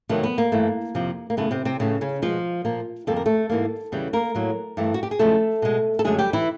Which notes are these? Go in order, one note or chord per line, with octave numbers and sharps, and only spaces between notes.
F2 C3 D#3 F#3 A3 B3
B3
A#3
G2 E3 A3
F2 C3 F3
A#3
F#2 C#3 E3 A3 B3
C3 C4
C3 C4
A2 C#3 E3 A3 C#4
C#3 C#4
B2 F3 G#3 F4
A#2 F3 A#3
F2 D3 G3 A#3 A4
A#4
A3 A4
G#2 E3 G3 A#3
E2 C#3 E3 G3
A#3 A#4
A2 F#3 A#3
G2 E3 A3
F#4
G4
G#4
E2 C#3 F3 G#3 A3 A4
B2 G#3
A4
F#2 D3 F#3 G#3 A3 G#4
G3 G4
E3 E4